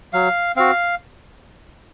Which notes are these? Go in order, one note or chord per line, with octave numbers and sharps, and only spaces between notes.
F#3 F5
C4 F#4 F5